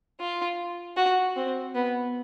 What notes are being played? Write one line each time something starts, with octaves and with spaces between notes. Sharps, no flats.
F4
F#4
C4
B3